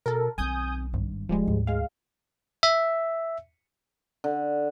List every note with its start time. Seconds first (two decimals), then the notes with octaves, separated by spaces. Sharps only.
0.06 B2 A4 A#4
0.38 B1 D#3 C4 G#5 D#6 G6
0.93 G#1 G2
1.29 D1 F3 G3 G#3
1.47 D2 G#2
1.67 G#3 F5
2.63 E5
4.24 D3